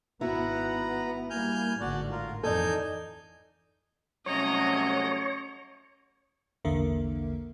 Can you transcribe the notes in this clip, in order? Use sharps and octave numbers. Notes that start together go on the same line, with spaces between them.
G#1 B3 E4 F#4 B4 F#5 A#5
G3 A#3 G#5 F6 G6
G#1 A2 D3 F#4 D5
F4 A#4
F2 E3 D#4 A4 D5 G#5 G6
C2 F#3 A3 C#4 C#5 D#5 A#5
A#1 E2 D3 A#3 A#4 E5